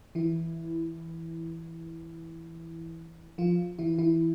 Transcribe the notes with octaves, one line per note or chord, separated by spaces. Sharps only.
E3 E4
F3 F4
E3 E4
E3 E4